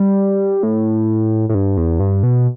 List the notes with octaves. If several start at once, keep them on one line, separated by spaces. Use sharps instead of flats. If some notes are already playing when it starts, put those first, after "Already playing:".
Already playing: G3
A2
A2
G2
E2
G2
B2